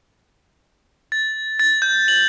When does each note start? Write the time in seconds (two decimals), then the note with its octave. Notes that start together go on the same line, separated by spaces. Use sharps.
1.12 A6
1.60 A6
1.82 G6
2.08 F#7